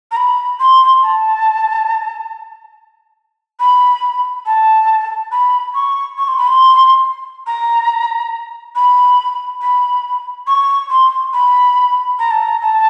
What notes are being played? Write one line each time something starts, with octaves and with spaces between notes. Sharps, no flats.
A#5
B5
C6
A5
B5
A5
B5
C#6
C#6
C6
B5
C6
A#5
B5
B5
C#6
C6
B5
A#5
A5
A#5
A5